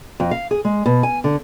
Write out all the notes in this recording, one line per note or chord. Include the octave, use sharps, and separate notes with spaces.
F2
F5
G#4
G#3
B2
G#5
D3